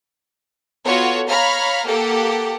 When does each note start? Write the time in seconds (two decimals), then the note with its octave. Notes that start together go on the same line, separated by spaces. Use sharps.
0.86 B3 F4 F#4 A4 C#5
1.28 C#5 F5 A#5 B5 F6
1.85 A#3 G4 A4 F#5